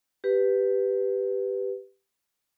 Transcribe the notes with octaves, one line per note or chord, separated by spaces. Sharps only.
G4 B4